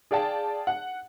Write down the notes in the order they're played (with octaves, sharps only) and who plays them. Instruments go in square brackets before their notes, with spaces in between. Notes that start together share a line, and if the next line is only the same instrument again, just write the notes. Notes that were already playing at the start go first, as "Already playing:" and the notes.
[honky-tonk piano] G#4 D5 F5 G5 A5
F#5